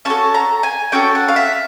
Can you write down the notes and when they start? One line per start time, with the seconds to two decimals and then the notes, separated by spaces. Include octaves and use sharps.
0.05 C#4 F#4 A4 A5
0.34 A#5
0.63 G#5
0.92 C#4 F#4 A4 G5
1.15 F#5
1.28 F5
1.36 E5